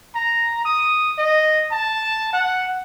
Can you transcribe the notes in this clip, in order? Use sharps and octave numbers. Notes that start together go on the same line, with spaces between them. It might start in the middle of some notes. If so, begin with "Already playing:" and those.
A#5
D#6
D#5
A5
F#5